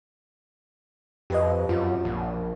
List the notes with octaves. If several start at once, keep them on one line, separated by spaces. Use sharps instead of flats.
F2 G4 B4 D#5
F#2 F4
A#1